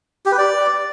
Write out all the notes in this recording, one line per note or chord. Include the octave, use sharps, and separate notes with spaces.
G4
B4
D5